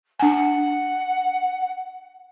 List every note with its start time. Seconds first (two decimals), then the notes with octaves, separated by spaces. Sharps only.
0.20 D4 F#5 G#5